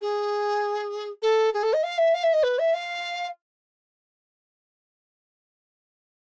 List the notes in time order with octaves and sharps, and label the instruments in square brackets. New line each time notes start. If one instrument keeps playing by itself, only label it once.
[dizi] G#4
A4
G#4
A4
D#5
F5
E5
F5
E5
D#5
B4
E5
F5